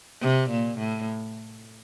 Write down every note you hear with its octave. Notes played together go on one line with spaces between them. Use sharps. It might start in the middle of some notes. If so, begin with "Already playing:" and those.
C3
A#2
A2